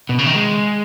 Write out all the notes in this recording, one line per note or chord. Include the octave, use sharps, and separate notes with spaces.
B2
C#3
D#3
G#3